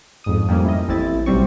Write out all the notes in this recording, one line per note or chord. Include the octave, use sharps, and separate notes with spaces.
F2 G#2 D#6
F2 G3 A#3 C#4
E4 D#5
A1 C4 E4 A6
B1 G3 C4 C#6